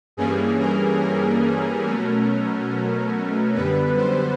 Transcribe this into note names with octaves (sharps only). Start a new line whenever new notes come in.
G2 E3 G3 A#3 C#4 G#4
A#4
A#4
B2 F#3 A3 C#4
F#2 D3 G3 B3 B4
C5